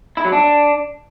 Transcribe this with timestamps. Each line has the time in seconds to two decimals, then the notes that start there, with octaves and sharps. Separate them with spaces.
0.17 E4
0.25 F#3
0.32 D4